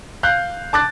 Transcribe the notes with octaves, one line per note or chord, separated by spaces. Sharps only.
F5 F#6 G6
A5 D6 F#6 A6